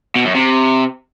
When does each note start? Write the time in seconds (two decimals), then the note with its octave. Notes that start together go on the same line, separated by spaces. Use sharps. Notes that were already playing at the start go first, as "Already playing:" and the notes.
0.16 B2
0.25 F#2
0.34 C3